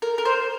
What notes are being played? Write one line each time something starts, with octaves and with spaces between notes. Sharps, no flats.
A#4
A#4
C5